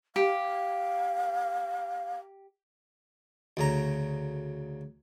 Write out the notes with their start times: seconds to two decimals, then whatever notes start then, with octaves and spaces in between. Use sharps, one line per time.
0.16 G4 F5
3.57 D2 C#3 A#5